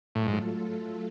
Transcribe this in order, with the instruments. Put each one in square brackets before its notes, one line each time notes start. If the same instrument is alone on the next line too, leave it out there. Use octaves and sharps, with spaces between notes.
[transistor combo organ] A2 [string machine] F#3 A3 F4 A4
[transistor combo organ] G#2